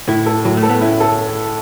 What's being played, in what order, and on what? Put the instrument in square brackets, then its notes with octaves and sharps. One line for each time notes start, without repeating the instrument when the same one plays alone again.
[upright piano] A2 [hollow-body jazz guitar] E4
[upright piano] A4
[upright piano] A2 [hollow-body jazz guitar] F#3
[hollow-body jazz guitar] A3
[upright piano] A4
[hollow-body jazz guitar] B3
[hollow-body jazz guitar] C#4 [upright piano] E4
[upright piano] A4